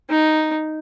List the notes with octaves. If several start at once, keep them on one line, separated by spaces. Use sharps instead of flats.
D#4